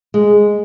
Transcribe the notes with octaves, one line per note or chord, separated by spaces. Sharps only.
G#3